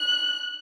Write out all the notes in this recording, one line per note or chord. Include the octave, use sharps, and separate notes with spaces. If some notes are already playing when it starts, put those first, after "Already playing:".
Already playing: F#6